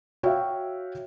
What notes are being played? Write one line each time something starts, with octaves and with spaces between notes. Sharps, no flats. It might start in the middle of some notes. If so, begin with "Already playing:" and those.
F#4 C#5 E5 F5 G5